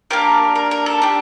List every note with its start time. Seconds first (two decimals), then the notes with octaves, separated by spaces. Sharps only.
0.10 A#3 D4 G4 A#4
0.55 A#4
0.71 A#4
0.86 A4
1.02 D4 G4